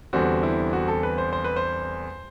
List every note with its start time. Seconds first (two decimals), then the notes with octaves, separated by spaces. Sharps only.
0.13 E2 D3 G3 C4 F#4
0.43 E4
0.73 F#4
0.88 A4
1.03 B4
1.18 C5
1.33 C5
1.44 B4
1.56 C5